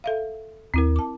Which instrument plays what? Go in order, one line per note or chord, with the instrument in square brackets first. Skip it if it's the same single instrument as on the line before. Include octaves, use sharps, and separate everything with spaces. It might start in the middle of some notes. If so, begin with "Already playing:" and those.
[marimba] A4 E5 F5
[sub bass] D#2 [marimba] C4 E4 A#4
[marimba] A5 D6